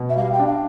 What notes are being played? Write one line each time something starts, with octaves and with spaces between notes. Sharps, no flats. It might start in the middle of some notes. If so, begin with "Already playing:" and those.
Already playing: B2
E5
G3 F5
G5
D4
F5